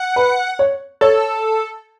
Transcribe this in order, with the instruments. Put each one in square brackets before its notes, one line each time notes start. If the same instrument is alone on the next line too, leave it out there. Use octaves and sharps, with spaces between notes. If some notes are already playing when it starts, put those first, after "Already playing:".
Already playing: [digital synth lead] F#5
[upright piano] B4
C#5
[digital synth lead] A4 [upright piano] C#5